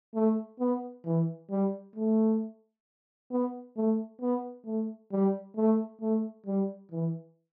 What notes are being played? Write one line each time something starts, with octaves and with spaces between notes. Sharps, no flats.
A3
B3
E3
G3
A3
B3
A3
B3
A3
G3
A3
A3
G3
E3